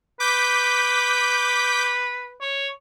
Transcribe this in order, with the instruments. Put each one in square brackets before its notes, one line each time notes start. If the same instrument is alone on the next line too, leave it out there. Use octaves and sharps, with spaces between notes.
[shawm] B4 [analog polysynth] D6 G6 B6
[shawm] C#5